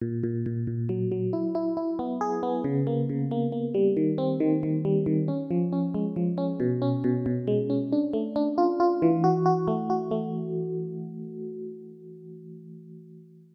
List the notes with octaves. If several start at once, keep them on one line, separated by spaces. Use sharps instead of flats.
A#2
A#2
A#2
A#2
F#3
F#3
E4
E4
E4
B3
G#4
B3
C#3
A#3
C#3
A#3
A#3
G3
D#3
C4
D#3
D#3
G3
D#3
C#4
F3
C#4
G#3
F3
C#4
B2
C#4
B2
B2
G#3
C#4
D4
A3
D4
F4
F4
E3
F#4
F#4
A3
F#4
A3